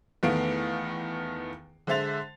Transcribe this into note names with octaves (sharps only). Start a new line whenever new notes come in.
E2 D#3 A3 B3 F5 D7
D3 G#3 C5 E5 A6 F7